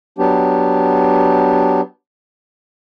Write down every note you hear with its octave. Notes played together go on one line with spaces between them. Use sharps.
F#3 B3 D4 G4